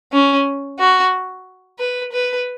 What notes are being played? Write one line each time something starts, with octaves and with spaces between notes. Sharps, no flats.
C#4
F#4
B4
B4